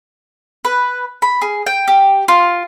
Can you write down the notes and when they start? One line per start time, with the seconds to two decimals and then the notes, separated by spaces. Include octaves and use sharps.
0.65 B4
1.22 B5
1.42 G#4
1.66 G5
1.88 G4
2.28 F4